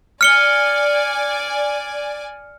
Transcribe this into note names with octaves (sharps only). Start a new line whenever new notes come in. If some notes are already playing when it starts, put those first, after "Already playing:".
D5 G#5 F6 C#7 G7